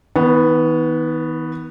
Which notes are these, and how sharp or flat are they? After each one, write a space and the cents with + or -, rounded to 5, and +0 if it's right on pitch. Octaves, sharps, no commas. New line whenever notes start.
D#3 +45 B3 +0